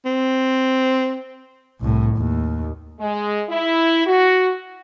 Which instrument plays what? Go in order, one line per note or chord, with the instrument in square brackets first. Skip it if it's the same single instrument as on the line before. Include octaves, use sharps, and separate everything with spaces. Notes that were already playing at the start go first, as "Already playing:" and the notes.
[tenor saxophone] C4
[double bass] C2 A2
D#2
[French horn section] G#3
E4
F#4